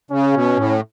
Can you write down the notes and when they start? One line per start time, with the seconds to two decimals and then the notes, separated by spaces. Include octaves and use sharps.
0.11 C#3 C#4
0.34 B2
0.57 A2